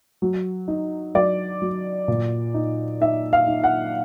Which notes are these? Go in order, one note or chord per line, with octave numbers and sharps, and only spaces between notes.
F#3
D#4
F#3 D5
F#3
A#2
D#4
D#4 E5
F5
D#4
F#5